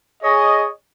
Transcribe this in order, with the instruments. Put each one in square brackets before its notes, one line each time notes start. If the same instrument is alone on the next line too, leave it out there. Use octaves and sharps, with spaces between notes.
[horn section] G#4 C#5 D#5